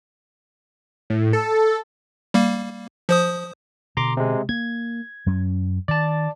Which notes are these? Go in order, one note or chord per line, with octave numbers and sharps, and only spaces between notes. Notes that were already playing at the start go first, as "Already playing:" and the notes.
A2
A4
G3 A#3
F3 C5 D#6
B2 D3 A#5 C6 D6
C3 G#3
A#3 G#6
F#2 F#3 C#4
D#3 D5 A5